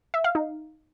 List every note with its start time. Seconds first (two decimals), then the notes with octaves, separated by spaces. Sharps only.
0.14 E5
0.24 F5
0.35 D#4